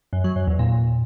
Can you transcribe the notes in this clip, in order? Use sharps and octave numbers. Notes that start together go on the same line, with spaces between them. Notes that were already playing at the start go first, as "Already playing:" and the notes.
F#2
F#3
F#2
E2
A#2